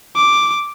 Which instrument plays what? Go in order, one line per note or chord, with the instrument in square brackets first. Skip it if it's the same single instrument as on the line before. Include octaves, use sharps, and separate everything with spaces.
[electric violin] D6